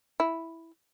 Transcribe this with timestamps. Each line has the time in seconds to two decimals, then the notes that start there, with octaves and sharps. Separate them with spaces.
0.20 E4